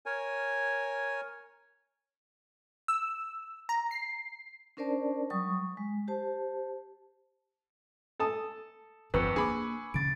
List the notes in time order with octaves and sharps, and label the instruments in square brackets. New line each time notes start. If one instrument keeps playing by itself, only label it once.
[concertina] A#4 C#5 G#5
[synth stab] E6
A#5
C7
[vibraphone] C#4 D4 A#4 C5 D5 A5
F#3 G3 C#6 D#6
G#3
G4 C5 A5
[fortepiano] A4 A5 D#6
[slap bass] G1 D3 [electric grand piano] F2 [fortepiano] B4 [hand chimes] C#6 E6 C#7
[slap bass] A#3 D4 [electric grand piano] G#4 B5 D6
[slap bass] D2 C#3 [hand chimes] A6 D7